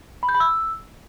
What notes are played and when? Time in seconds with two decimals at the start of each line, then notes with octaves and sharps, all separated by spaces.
0.23 B5
0.29 G6
0.34 B5
0.40 E6